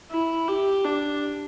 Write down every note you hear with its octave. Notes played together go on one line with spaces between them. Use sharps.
E4
G4
D4